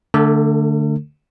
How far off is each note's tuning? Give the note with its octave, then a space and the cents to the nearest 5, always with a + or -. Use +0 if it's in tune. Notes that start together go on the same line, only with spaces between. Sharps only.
D3 +0 A3 +5 A4 +45